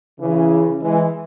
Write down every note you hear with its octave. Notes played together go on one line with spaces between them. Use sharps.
C#3 E3
E3 G#3